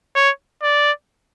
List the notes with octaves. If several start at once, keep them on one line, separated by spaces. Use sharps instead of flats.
C#5
D5